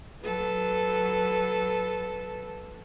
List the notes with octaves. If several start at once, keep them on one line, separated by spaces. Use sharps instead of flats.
F#3 A4 B4